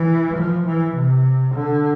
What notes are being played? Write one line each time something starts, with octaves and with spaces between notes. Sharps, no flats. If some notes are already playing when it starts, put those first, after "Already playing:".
Already playing: E3
F3
E3
C3
D3